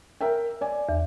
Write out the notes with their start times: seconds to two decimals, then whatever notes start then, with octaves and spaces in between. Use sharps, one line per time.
0.21 A#4 E5 G5
0.61 D5 G#5
0.89 E2